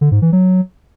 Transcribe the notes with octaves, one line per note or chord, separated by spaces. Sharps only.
D3
G#2
E3
F#3